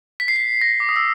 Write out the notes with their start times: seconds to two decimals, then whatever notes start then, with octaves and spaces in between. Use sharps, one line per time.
0.20 B6
0.28 C7
0.36 B6
0.61 A#6
0.80 D6
0.89 D#6
0.96 E6